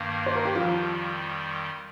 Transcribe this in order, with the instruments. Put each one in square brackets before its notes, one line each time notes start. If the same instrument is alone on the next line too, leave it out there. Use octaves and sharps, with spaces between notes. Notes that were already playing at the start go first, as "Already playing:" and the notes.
Already playing: [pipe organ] G2 D#3 A#3
[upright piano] C5
A#4
G4
[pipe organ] F2 D#3 G3 [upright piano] F3 F4